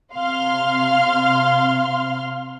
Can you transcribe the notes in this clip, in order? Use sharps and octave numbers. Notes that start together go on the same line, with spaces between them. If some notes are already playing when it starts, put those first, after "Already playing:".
C3 F5 C6 F6